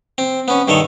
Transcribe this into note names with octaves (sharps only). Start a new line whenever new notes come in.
C4
B3 C#4
G2 D#3 A4 C#5